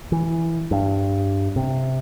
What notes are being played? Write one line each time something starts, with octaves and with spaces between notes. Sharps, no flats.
E3
G2
C3